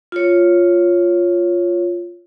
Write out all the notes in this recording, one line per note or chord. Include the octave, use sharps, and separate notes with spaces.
F4 C#5